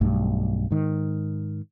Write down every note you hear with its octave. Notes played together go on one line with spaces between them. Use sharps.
B1 G2 A3
G#2 D#3